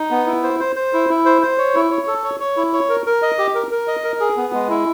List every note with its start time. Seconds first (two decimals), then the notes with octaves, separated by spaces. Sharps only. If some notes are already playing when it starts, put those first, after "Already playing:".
Already playing: D#4
0.11 B3
0.27 E4
0.43 C5
0.60 C5
0.76 C5
0.93 E4
1.09 E4
1.26 C5
1.42 C5
1.58 C#5
1.75 E4
1.91 C#5
2.07 A4
2.24 C#5
2.40 C#5
2.57 E4
2.73 C#5
2.90 A#4
3.06 A#4
3.22 D#5
3.38 G4
3.55 A#4
3.71 A#4
3.88 D#5
4.04 A#4
4.20 G#4
4.37 B3
4.53 G#3
4.70 E4